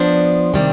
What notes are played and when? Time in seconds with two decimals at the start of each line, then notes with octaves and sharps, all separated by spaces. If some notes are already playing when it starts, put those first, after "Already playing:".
Already playing: F3 B3 D4 C5
0.54 C3 D#3 G3 D4